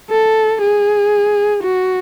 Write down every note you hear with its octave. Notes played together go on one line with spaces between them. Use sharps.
A4
G#4
F#4